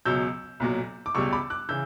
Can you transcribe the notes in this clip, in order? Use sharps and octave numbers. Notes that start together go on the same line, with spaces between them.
C#2 B2 F#3 E6 G6
B1 A#2 F#3
D6
C#2 B2 G3 C#6 E6
B5 D6
D6 F#6
C#3 E3 E6 G6